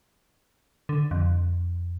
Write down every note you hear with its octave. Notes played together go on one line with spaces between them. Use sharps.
D3
F2